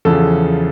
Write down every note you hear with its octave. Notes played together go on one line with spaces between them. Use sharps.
E2 C#3 F3 A4